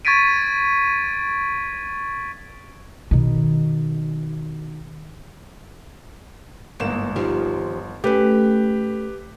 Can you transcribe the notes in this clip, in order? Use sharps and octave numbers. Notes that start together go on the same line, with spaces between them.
C#6 G#6 A6 B6 D7 D#7
B2 D#3
G1 G#2 E3 A#3 E7
D#3 F3 G3
A3 C#4 G4 B4